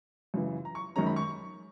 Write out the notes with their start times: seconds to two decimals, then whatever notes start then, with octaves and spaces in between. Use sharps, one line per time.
0.34 F#2 C#3 E3
0.65 A#5
0.75 C#6
0.96 F#2 D#3 G#3 C#4 A#5
1.07 B5
1.16 C#6